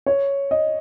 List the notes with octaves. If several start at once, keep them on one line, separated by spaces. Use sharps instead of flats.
C#5
D#5